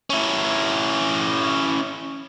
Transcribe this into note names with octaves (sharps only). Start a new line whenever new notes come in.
C#4 E4